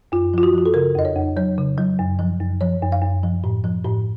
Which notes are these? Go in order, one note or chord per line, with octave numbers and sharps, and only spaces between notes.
F#2 F4
F3 F4
F#4
F3 F#4
A4
C#3 A#4
F2 D#5
C#5
F2
F#3 C#5
C#3
F#3
F#2
F3
F#2
F3 C#5
F#2
F5
F#2
F3
A2
F3
A2